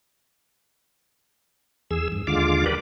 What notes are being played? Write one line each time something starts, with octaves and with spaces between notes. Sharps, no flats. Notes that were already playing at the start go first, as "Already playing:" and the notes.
E2 G#4 E6
G2
D#2 D3 G#3 F4 F5 D6
G4 A#4 B4 D5